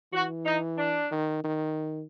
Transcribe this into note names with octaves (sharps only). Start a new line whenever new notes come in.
E3 F#4
D#4
D4
D#3
D#3